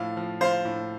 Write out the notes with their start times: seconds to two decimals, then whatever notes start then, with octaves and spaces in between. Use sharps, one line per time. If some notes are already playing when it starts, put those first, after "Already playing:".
Already playing: A2 F3 F5
0.17 F3
0.41 F3 C5 F5
0.65 A2